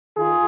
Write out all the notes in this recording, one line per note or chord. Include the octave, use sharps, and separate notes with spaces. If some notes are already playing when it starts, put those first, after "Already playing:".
D#3 F4 G#4